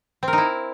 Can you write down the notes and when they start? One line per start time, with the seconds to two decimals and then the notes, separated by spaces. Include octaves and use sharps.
0.23 C4
0.28 A#4
0.33 D#4
0.38 E4